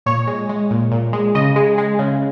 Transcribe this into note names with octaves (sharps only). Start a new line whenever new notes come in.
A#2 C#5
G#3
G#3
A#2
A#2
G#3
C#3 D#5
G#3
G#3
C#3